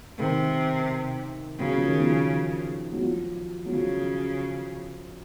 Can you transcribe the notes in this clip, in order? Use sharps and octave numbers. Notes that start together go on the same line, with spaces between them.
C3 D#3
C#3 F#3
F3
D#3
F3
F#3
F3
F#3
C#3 F3